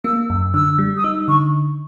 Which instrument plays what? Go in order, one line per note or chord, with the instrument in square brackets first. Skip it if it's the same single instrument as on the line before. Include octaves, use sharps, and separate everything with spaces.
[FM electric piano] A#3 [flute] E6
[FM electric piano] F#2 [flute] E6
[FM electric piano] D3 [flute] E6
[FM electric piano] G3
[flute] D#6
[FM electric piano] D#4 [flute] E6
[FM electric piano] D3 [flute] C#6